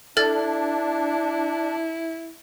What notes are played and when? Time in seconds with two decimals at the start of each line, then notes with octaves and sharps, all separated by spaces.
0.17 D4 E4 A4 F6 A6